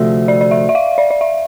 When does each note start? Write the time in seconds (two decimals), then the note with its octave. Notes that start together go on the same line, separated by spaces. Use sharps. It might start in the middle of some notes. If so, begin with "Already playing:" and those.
Already playing: D2 C3 F3 A3 E5
0.28 D5
0.41 D5
0.51 E5
0.69 E5
0.75 F5
0.98 D5
1.11 D5
1.21 E5